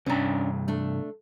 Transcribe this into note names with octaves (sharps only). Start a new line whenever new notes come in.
C2 G2 C#4 D4 A#5
A3 D4